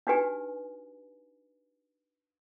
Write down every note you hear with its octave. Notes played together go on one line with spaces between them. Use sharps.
D4 D#4 F#4 G4 B4 G#5